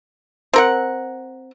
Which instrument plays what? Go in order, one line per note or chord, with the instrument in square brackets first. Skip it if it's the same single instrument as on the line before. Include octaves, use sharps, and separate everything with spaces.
[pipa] C4 A#4 F#5